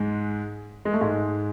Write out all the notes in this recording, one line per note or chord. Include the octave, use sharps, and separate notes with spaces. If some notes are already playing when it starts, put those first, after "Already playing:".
Already playing: G#2 G#3
G#3
A3
G#2 G#3